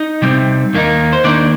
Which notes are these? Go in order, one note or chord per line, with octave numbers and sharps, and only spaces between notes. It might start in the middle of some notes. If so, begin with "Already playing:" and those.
Already playing: D#4 D#5
C3 G3 C4
D#2 D#3 A#3 D#4
C5
D#2 D#3 A#3 D4 D#4 D5